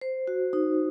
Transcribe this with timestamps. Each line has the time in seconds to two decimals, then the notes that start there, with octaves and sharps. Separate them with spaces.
0.01 C5
0.28 F#4
0.53 D#4